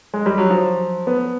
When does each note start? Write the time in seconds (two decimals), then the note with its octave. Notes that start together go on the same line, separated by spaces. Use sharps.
0.14 G#3
0.26 G3
0.38 F#3
0.50 F3
1.07 B3